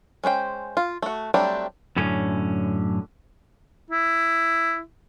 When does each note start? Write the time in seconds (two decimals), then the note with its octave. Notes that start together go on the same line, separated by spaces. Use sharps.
0.24 G#3 C#4 C5 G5
0.77 F4
1.02 A3 F#4
1.34 F#3 G3 A3 C4 D4
1.96 F#2 A2 D3 C#4
3.90 E4